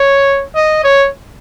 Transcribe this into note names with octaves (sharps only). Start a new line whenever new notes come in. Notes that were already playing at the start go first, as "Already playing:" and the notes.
Already playing: C#5
D#5
C#5